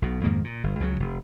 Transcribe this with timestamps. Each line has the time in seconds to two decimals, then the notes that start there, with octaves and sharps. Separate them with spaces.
0.02 B1 B2
0.24 F2 G#2 D#3 A#3
0.44 A#2
0.64 G1
0.80 C#2 C#3 E3 F#3
1.00 F1